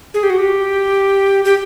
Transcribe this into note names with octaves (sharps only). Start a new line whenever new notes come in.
G#4
G4
F#4
G4
G4